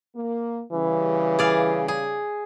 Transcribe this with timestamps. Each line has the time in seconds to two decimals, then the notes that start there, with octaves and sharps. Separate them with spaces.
0.15 A#3
0.72 C#3 E3 G3
1.39 G#4 D5 F5
1.88 G#4